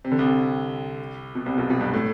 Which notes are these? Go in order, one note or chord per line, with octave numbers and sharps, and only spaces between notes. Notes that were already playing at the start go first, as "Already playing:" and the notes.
C3
D3
C2 C3
B2
C2 C3
B1 B2
B1 B2
G2
A2